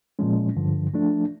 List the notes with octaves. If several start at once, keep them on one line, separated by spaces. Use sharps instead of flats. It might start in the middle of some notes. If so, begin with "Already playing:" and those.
A#2 F3 G#3 C#4
G2 D3 F3
F3 A3 D4